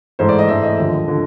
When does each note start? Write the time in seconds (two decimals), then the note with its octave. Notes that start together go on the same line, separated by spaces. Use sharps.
0.19 G#2 E3 A3 C5
0.29 D5
0.39 D#5
0.49 G#2 E3 A3 E5
0.63 D#5
0.78 D#2 D3 F3
1.08 D3 F3